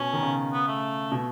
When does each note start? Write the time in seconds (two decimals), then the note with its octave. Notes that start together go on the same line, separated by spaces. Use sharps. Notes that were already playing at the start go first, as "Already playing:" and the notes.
Already playing: B2 C#4
0.13 D#3
0.23 C#3
0.53 B3
0.68 A3
1.12 B2